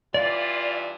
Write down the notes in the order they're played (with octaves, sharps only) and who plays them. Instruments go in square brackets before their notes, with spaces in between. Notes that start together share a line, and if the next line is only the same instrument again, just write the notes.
[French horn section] G2 E3 F4 [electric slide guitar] D5